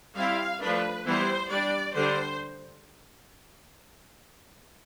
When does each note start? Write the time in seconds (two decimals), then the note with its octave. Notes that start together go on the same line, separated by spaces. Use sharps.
0.16 G3 C4 E4 F5
0.61 F3 A3 D4 B4
1.06 E3 G3 B3 E4 C5
1.50 G3 D4 D5
1.95 D3 G3 D4 C5